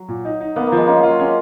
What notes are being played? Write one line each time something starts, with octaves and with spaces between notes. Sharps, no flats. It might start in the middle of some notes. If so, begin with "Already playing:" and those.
Already playing: F#3
A#2
D#4
D#4
A#3 B3
A#3
F3 G#3
A#3 C#4
G#3
F4
F#3
G#3 C#4